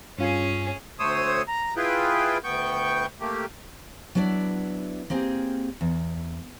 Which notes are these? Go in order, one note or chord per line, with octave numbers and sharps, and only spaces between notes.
G2 C#4 F4 G#4 G#5
D2 A3 C5 C#5 D#6 E6
A#5
E4 F4 G#4 B4 G5
D2 B3 G5 C#6 G6
A3 A#3 G4
F#3 B3 D4 E4 D5
A#3 C4 G4 G#4
E2